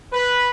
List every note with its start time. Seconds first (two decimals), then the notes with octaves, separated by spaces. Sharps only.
0.13 B4